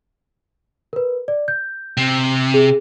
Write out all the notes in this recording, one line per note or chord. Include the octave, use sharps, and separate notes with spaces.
A#4 B4
D5
G6
C3
G#4